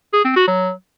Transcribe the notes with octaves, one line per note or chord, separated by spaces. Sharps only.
G#4
C4
F#4
F#3